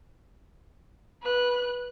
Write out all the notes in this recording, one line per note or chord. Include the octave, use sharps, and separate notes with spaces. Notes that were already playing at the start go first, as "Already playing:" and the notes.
B4 F#6